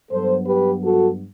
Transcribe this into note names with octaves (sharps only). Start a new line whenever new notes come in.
G2 F#3 B3 A4 C5
G4 B4
F#4 A4